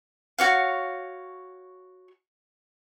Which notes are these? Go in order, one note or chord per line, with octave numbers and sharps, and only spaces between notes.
F#4 C#5 F5